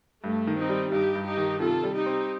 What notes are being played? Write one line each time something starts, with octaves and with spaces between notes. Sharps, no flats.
G2 A3
D#3
C4 D#4
G3
G2 D#4 G4
G2
D#4 G4
D#3
C3 F4 A4
G3
D#4 G4
C4